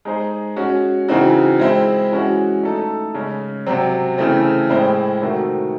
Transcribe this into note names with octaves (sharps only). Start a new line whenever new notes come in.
G#3 D#4 G#4 C5
G#3 C#4 F#4
C#3 E3 C4 D#4 F#4
G#3 C4 E4 C5
E3 G#3 C#4 F#4
A3 D#4 A4
C#3 G#3 C#4
C3 F#3 C4
C#3 E3 A3 C4
A2 G#3 C4 E4 C5
C3 D#3 A3 C4 F#4